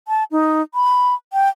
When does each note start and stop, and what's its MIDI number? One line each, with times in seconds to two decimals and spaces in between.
0.08 0.24 81
0.31 0.62 63
0.75 1.14 83
1.33 1.49 79